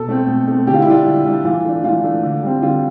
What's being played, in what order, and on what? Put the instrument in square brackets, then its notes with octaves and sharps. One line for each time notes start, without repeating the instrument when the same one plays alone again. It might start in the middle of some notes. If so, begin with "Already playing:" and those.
Already playing: [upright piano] B2 A4
A3 C4
B2
A3 C4
D3 G4
F4
E4
G3 D4 F4
D3
G3 D4
E3 F4
A3 D4
E3 F4
A3 D4
D3
G3 C4
D3 F4